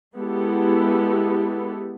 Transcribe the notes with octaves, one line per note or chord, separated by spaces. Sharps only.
G#3 B3 E4 G4 A4